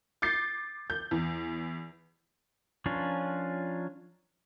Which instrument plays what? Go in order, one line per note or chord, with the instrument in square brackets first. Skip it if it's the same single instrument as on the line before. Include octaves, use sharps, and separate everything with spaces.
[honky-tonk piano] D6 G6 A6 C7
G6
E2
[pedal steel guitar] F3 C#4 D4 F4 A#4